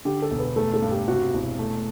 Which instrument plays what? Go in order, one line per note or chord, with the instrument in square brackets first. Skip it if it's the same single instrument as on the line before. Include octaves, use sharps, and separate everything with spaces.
[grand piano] D3 [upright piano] G4
[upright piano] A4
[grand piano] E1
[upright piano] B4
[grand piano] A3 [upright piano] A4
[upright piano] A4
[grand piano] G2
[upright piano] G4
[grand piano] C3 [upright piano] F#4
[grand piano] E1 [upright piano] E4
[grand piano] A3